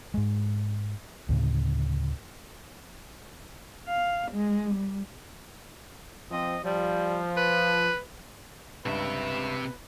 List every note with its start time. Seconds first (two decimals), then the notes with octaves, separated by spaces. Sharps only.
0.14 G#2 G#3
1.29 D2 A2 C#3
3.88 F5
4.32 G#3
4.75 G3
6.31 F3 C4 D#5
6.65 F3 G3
7.37 B4
8.86 C#2 G2 C3 B4 E5